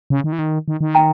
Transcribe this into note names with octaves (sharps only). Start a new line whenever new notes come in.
C#3
D#3
E3
D#3
D#3
D#3
G5 A#5